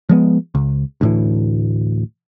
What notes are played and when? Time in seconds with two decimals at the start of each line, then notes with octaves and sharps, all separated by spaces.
0.09 F3 G#3 B3
0.55 C#2
1.01 D2 A2 E3